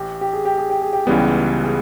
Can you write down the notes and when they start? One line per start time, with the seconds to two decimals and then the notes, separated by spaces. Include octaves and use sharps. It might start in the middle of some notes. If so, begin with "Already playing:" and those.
Already playing: A1 G4
0.21 G4
0.33 G#4
0.45 G4
0.58 G#4
0.70 G4
0.82 G#4
0.93 G4
1.06 C#2 C#3 E3 G3 B3 G#4
1.18 G4
1.64 G#4